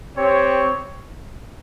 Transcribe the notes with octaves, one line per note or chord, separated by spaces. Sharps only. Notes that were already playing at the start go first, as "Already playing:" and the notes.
C4 G4 C#5